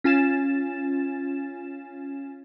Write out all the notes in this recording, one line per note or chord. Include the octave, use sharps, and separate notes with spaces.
C#4 F4 G#5 A6 E7